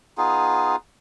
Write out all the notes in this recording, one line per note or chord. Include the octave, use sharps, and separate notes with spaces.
B3 D#4 F4 G#4